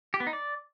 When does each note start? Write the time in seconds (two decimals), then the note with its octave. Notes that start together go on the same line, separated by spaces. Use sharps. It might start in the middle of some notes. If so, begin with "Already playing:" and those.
0.14 G4
0.20 B3
0.27 D#4
0.33 D5